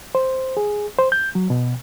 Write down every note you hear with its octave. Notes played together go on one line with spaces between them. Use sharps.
C5
G#4
C5
G6
F#3
B2